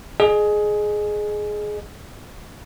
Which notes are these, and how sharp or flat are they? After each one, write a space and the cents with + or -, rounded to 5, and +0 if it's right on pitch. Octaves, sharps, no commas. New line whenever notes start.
G#4 +15 D#5 -30